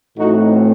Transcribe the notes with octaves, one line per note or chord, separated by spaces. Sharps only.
A2 E3 A3 C4 D#4 F#4